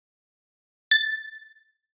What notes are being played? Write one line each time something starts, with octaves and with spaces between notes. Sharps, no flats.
A6